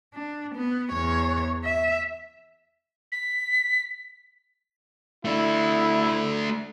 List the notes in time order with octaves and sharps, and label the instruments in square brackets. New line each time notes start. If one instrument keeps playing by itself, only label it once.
[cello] D4
B3
E2 C#5
E5
[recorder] B6
[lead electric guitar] A3 D4 [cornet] E4